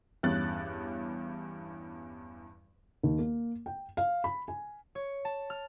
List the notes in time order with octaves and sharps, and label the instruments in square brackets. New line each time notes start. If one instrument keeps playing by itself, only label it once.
[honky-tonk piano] E2 G2 C#4 F#6 A6
[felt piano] D#2
A#3
G5
F5
B5
G#5
[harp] C#5
A5
F6